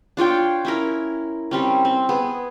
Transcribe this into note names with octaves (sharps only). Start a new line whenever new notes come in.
D4 F4 C#5 G5
C#4 E4 A#4
G3 C4 C#4
C4
B3 G#4